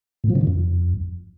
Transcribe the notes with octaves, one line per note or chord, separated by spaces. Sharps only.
A#2
F3
C#3
D#3
F2